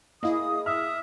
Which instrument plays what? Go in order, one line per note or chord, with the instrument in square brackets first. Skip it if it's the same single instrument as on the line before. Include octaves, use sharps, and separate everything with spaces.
[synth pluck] A#3 E4 G#4 [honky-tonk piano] D#5 F5 [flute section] D#6
[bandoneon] E5 [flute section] D#6 [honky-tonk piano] F6